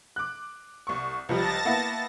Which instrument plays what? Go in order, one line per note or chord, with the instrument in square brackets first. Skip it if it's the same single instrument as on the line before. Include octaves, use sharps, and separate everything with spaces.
[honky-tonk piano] D6 F#6
C2 C#6
[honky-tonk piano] C#2 F3 G3 [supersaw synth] A5 A6 A#6
[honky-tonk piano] A#3 B3 E4